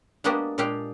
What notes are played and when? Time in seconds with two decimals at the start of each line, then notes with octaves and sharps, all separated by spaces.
0.24 G#3 A#3 B3 D4 F#4 G4
0.58 A#2 G#3 D4 G4 F5 G5